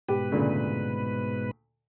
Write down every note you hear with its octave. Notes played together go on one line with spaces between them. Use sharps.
G#2 B2 G4 B4
D2 A#2 C#3